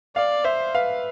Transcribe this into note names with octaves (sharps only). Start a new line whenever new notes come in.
D5 F5
C5 E5
B4 F5